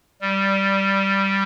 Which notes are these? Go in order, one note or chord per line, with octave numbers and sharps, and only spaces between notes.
G3